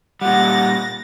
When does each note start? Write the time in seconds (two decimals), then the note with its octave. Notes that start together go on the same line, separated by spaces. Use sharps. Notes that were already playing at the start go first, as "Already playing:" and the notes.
0.21 A#2 G3 F#5 A6 A#6